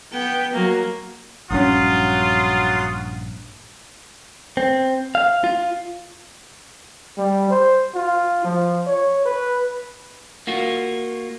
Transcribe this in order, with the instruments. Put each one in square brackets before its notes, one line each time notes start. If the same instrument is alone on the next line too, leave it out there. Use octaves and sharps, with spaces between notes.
[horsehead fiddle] B3 G5
F#3 A#3
[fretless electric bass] A#1 G2 C#4 [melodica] F#3 F#5 D#6 [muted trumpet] F4
[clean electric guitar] C4
F5
F4
[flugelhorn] G3
C5
F4
F3
C#5
B4
[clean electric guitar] A#3 F4 F#4